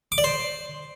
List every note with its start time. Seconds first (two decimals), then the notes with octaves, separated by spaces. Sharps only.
0.12 D6
0.18 D5
0.24 C5